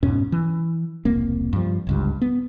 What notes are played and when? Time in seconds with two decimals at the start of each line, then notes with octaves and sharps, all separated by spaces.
0.03 F2 G#2 B2 C#4
0.32 E3
1.05 E1 C2 A#3 C4
1.53 G2 F3
1.87 G1 C#2 G2
2.22 B3